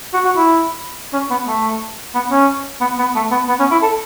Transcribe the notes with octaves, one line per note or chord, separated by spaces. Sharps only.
F#4
F#4
E4
C#4
B3
A3
B3
C#4
B3
B3
A3
B3
B3
C#4
E4
A4